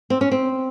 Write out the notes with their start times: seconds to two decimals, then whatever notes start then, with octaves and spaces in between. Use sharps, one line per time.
0.10 C4
0.21 C#4
0.31 C4